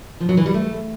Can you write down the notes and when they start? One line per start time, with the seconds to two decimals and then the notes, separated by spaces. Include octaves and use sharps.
0.20 F3
0.29 F#3
0.37 E3
0.46 G3
0.54 A3